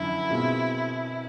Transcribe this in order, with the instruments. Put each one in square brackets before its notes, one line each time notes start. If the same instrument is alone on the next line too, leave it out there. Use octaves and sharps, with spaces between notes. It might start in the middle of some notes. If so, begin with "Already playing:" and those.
Already playing: [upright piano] F#2 D3 F3 [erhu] E4
[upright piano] B2 G#3 C4 F4